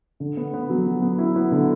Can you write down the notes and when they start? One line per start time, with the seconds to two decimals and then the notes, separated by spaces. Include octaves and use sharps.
0.20 D3
0.37 B3
0.54 B3
0.70 F#3
0.86 F#3
1.02 B3
1.18 E4
1.36 B3
1.52 D3